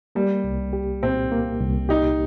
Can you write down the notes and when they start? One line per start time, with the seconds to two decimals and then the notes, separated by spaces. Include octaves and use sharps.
0.15 G3 A#3
0.44 C2
0.73 G4
1.03 A#2 C4
1.32 A#3
1.61 C2
1.89 D#4 G4